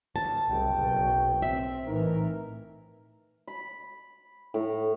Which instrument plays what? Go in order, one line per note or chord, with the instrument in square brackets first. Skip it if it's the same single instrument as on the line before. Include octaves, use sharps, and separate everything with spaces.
[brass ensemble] D2 [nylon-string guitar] A5
[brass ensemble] F#1 G5 [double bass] C2
[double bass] B1
[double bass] C4 [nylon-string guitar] E5
[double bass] A2 E3 [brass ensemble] D#4 A#4
[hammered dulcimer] B5
A2